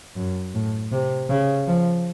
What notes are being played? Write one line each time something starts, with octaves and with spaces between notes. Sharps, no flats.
F#2
A2
C3
C#3
F3